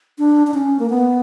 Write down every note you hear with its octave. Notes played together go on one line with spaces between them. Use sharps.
D4
D4
C#4
A#3
B3